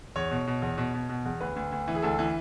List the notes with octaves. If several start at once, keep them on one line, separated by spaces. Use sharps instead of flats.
E2 C#5
B2
B2
E2
B2
B2
B2
E2
D2 B4
D2
D2
E3
G#4
D2 A4
E3